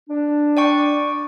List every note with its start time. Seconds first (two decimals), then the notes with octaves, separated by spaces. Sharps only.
0.09 D4
0.57 D5 G5 C#6